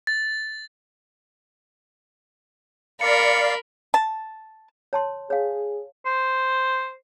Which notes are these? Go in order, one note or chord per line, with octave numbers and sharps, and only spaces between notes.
A6
A#4 D5 F5 B5 C#7
A5
C#5 A5 C6
G#4 C#5 F5
C5